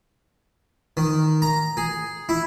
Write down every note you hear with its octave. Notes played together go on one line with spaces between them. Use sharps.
D#3
A#5
G#4
E4